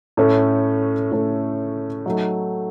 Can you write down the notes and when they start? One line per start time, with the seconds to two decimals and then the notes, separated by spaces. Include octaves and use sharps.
0.17 A2 A3 C#4 A4
1.11 A2 A3 C#4 A4
2.06 F#3 A3 D#4